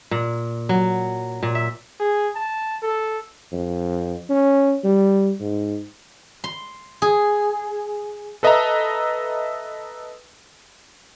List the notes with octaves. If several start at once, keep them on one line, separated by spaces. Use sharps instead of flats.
A#2
F#3
A#2
E5
G#4
A5
A4
F2
C#4
G3
G#2
C6
G#4
A4 B4 D#5 E5 A5 A#5